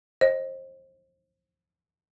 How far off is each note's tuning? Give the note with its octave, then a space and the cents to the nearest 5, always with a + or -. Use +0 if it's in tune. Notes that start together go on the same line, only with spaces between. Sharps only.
C5 +30 D#5 +0